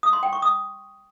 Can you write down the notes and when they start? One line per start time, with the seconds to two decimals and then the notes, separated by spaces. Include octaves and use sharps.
0.03 D#6
0.13 C6
0.23 G5
0.33 C#6
0.42 D#6